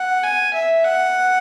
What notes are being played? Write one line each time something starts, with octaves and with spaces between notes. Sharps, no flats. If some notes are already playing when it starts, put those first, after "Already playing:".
Already playing: F#5
G#5
E5
F#5